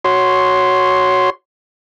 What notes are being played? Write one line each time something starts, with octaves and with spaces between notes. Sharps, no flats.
F#4 C#5 C6